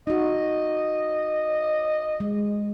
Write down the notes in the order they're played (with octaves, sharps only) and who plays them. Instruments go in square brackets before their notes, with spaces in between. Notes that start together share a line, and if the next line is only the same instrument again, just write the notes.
[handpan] D#4 F#4 [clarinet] D#5
[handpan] G#3